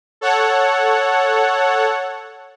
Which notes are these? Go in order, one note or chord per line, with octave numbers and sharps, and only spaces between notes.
A4 C#5 F#5